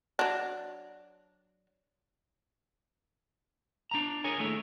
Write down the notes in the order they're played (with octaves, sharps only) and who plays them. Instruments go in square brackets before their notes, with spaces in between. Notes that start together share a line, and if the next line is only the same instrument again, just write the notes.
[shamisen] F#3 D4
[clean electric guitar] D4 A#5
G#4 A#4 C#5 G#5
D#2 A3 E4 C#5